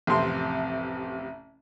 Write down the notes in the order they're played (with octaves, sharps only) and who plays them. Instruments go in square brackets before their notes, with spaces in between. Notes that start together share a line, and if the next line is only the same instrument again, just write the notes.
[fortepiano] A1 F2 C3 C6